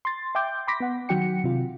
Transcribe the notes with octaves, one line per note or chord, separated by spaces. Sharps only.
C6 A6
E5 G5 C6 D6 G6
B5 C6 D6 A#6 B6
B3 F#5
D#3 F#3 F#4 F#5 G5 C#7
C3 F4